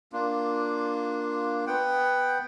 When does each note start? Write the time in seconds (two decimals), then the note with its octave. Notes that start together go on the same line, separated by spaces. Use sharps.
0.13 A#3 D4 F4
1.67 B3 F#5 G5